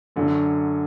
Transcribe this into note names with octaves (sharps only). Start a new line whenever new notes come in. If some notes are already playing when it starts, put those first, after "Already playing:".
F#2 D3 F#3